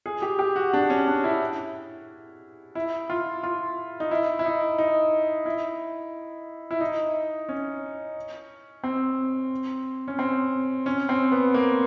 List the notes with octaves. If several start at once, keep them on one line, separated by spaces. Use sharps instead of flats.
G#4
G4
G4
F#4
D4
C#4
D4
E4
E4
F4
F4
D#4
E4
E4
D#4
D#4
E4
E4
D#4
C#4
C4
C#4
C4
C#4
C4
B3
A#3